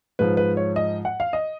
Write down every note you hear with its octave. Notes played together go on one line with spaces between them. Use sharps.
G#2 F3 B4
B4
C#5
D#5
F#5
F5
D#5